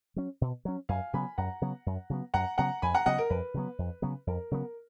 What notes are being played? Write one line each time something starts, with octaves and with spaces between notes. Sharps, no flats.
F#3 C#4
B2
F#3 C#4
F#2 F5 G#5
C#3 F#3 B3 G#5 B5
F#2 F#5 A#5
C#3 F#3 B3
F#2
C#3 F#3 B3
F#2 F#5 A#5
C#3 F#3 B3 F#5 A#5
F2 G#5 B5
F#5 A#5
C#3 F#3 B3 D#5 F#5
A#4
F2 B4
C#3 F#3 B3
F2
C#3 F#3 B3
F2 A#4
C#3 F#3 B3 A#4